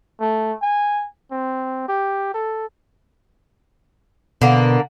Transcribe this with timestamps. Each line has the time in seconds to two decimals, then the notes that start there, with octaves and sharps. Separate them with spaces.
0.20 A3
0.62 G#5
1.31 C4
1.88 G4
2.34 A4
4.42 B2 D3 A#3